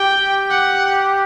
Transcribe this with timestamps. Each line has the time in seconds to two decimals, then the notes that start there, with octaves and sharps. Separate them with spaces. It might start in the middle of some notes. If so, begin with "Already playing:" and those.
Already playing: G4 G5
0.50 F#5